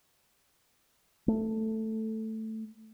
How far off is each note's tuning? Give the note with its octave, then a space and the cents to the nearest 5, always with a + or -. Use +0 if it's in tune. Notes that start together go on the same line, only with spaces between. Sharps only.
A3 +5